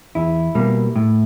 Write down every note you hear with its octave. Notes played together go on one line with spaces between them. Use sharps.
E2 E4
B2 G3 A#3
A2